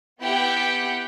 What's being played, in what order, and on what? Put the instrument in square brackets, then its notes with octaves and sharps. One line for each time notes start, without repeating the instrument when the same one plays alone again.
[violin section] B3 E4 G4 F#5 G6 B6